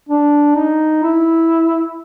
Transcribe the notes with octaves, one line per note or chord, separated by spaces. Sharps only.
D4
D#4
E4